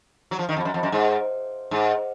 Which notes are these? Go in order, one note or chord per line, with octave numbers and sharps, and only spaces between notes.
F#3
F3
D#3
F2
F#2
F2
F#2
G#2
G#2